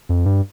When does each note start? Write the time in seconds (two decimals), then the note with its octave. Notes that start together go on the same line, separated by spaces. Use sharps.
0.09 F2
0.26 G2